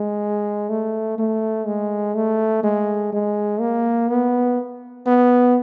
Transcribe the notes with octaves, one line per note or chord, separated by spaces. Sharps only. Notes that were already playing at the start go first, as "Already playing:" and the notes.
Already playing: G#3
A3
A3
G#3
A3
G#3
G#3
A#3
B3
B3